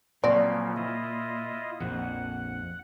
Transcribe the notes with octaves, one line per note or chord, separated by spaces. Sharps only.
A#2 C#3 F3 F#3 C4 D5
E4 F4 D#5
A#1 F2 F#5